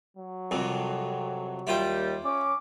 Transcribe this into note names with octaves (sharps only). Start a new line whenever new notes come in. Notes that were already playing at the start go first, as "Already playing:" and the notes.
F#3
C2 F2 C3
D#2 G3 E4 F4 G5
C#4 D6